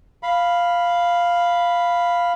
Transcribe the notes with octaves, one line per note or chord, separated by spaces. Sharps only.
F5 B5